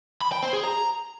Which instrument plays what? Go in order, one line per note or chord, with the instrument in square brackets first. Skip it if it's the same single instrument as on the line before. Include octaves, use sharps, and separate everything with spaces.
[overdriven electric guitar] B5
G5
C5
G#4
A#5